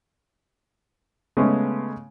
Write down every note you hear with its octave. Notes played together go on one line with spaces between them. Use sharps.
C#3 G#3 A3 B3 C#4